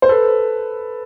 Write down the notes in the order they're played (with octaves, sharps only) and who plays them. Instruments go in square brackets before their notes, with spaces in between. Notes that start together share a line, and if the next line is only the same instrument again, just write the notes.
[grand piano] C5
A4 B4